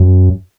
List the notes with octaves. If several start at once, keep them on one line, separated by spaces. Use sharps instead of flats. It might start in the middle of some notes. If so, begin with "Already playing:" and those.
Already playing: F#2